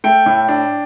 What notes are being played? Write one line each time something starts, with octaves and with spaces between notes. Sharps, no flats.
A3 G5
A2
D4